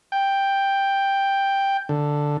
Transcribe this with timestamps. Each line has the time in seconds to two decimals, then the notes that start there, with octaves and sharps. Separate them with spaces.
0.12 G5
1.89 D3